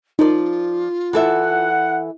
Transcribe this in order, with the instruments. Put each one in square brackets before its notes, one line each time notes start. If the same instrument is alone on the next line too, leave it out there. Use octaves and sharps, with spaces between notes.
[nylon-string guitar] F3 D5 [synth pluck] D#4 A#4 [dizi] F4
[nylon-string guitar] E3 A4 E5 [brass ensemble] F#5